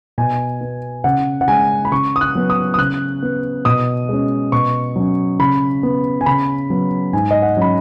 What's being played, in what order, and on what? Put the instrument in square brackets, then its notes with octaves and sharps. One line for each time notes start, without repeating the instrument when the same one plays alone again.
[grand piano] B2 G#5
B3
C#3 F#5
F#5
G#3 C#4 G#5
B5
C#3 C#6
D#6
F#6
F#3 B3
D#6
D#6
C#3 F#6
B3
B2 D#6
G#3 C#4
B2 C#6
F#3 C#4
C#3 B5
B3
G#5
C#3 B5
F#3 B3
G#2 G#5
D#5
F#5
F#3 C#4 B5